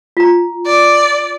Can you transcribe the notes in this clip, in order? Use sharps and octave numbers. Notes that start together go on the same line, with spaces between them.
F4 A#5
D5